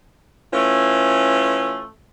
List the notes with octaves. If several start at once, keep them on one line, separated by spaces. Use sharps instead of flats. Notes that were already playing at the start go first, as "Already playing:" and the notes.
E3 A3 C#4 F4